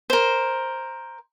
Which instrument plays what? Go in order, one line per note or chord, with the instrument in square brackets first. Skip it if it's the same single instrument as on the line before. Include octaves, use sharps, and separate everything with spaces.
[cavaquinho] A#4 C5